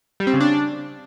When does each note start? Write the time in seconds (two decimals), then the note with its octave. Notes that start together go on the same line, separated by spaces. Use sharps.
0.20 G3
0.27 C4
0.34 C#3
0.40 D4